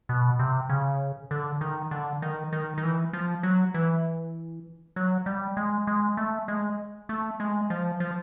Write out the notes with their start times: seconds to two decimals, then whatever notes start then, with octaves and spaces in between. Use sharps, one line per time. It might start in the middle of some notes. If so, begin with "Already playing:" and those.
0.09 B2
0.39 C3
0.70 C#3
1.31 D3
1.61 D#3
1.91 D3
2.22 D#3
2.53 D#3
2.78 D#3
2.83 E3
3.13 F3
3.43 F#3
3.74 E3
4.96 F#3
5.26 G3
5.57 G#3
5.87 G#3
6.17 A3
6.48 G#3
7.09 A3
7.40 G#3
7.70 F3
8.00 F3